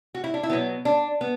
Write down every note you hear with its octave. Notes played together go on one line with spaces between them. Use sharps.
F#4
E4
D4
E4
B2 F#3 B3
D4
B3